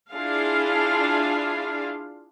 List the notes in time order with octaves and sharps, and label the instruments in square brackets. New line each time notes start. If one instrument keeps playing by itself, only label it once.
[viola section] D4 E4 F4 G#4 F5